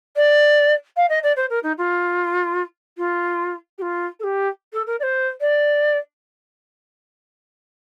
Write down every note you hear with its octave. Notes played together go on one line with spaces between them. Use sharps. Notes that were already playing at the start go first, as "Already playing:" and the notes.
D5
F5
D#5
D5
C5
A#4
D#4
F4
F4
G4
F4
A4
G4
A4
A#4
D5
C5
D5